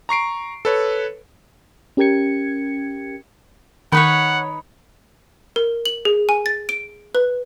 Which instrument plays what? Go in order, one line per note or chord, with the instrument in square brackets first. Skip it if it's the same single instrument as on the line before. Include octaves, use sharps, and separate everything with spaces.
[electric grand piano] A#5 C#6 C7 D7
A4 B4 C#5
[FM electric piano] C#4 G4 A#4 G5 G#6 C#7
[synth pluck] D#3 [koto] D#4 B4 C#5 [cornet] F#5 [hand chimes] B5
[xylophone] A#4
F#7
G#4
G#5
A6
D7
B4